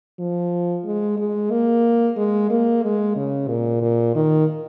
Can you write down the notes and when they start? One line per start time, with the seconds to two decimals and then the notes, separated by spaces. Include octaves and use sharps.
0.20 F3
0.85 G#3
1.18 G#3
1.51 A#3
2.17 G#3
2.50 A#3
2.83 G#3
3.16 C#3
3.48 A#2
3.82 A#2
4.15 D#3